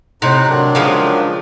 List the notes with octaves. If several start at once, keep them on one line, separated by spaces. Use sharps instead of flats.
A2 C3 D#4 F#6
D#3 F#3 D4
C#3 F3 G#3